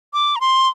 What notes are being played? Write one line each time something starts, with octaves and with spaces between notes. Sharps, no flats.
D6
A#5
C6